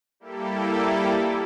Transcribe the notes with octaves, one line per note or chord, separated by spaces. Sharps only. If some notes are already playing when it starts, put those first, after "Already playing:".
G3 A#3 E4 G4 A4